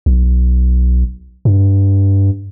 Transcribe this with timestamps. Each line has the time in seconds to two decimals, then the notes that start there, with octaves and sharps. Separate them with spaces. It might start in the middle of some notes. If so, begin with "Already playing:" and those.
0.06 B1
1.45 G2